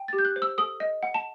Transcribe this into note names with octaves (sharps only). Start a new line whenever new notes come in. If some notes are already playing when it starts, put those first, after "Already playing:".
Already playing: G5
G4 A6
G6
F#6
C5
E6
A4 D#6
D#5
F#5
A5